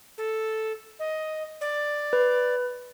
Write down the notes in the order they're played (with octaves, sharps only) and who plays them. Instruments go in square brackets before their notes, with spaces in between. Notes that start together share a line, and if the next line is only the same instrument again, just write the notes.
[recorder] A4
D#5
D5
[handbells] B4